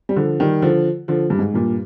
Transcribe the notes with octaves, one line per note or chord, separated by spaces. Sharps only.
G3
D3 F3
D#3 G3
D3 F3
D3 F3
G2
G#2
G2 A#2